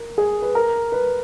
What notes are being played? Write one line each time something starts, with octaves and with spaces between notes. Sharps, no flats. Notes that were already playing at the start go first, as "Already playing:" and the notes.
Already playing: A#4
G#4
B4
A#4
B4